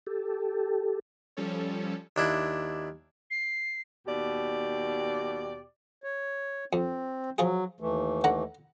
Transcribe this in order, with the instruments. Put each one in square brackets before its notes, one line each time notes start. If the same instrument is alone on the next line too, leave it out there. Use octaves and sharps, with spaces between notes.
[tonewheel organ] G4 A4
[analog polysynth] F3 G3 C#4 A4 C#5
[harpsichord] D#2 D4 E4
[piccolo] C7
[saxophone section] D#2 B2 G4 D5
[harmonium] C#5
[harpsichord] F2 [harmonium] C4
[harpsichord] F3 F4 G#4 [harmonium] F#3
[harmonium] D#2 E3 A3
[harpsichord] D3 F#5 A#5